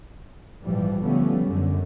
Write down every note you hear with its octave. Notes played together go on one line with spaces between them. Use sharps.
A#1 G#2 E3 F3 G3
D3 F3 G3 A3 B3 C#4
F#2 D3